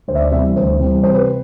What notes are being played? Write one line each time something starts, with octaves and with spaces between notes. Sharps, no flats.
D2 C5
E5
D5
C3 E3 G3 E5
D2 C5
C3 E3 G3
C3 C5
B4